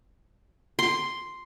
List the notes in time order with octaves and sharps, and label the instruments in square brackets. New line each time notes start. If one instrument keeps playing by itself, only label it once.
[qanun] C6